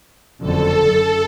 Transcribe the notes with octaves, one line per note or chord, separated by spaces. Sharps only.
F#1 F2 D3 A4
F#2